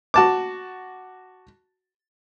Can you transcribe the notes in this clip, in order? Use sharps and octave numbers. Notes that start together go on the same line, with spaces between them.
F#4 A5 D6